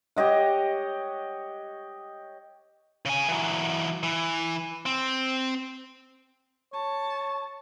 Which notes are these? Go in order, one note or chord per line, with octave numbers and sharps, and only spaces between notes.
G4 C#5 D#5 F#5
C#3 G#5
E3 F#3
E3
C4
C#5 A5